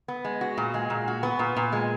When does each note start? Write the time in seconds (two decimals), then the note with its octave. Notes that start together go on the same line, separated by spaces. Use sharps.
0.08 B3
0.25 G#3
0.41 F#4
0.58 A#2
0.74 G#3
0.90 A#2
1.08 F#4
1.23 B3
1.39 A#2
1.57 A#2
1.72 G#3